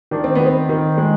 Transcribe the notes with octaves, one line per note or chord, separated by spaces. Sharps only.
D#3 D4
C4
D#3 B3
C4
D#3
G#3